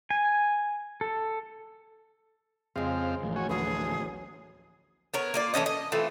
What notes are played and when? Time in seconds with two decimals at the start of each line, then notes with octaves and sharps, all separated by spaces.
0.10 G#5
1.01 A4
2.76 F2 C#3 G#3 C4 F5
3.23 A1 A2 F3
3.36 F#4 C#5 G#5
3.49 D2 F#3 B3 G#4
5.14 B3 A#4 C#5
5.34 A#3 F4 D5
5.54 E3 A3 C#4 D#5
5.66 D#5
5.92 E3 A3 C4 F4